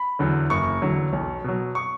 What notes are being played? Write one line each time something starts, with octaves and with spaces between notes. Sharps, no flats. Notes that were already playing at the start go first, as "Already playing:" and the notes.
Already playing: B5
E2 D3 F#3
F#1 C#6
E2 D3 F#3
B1
B2 F#3
C#6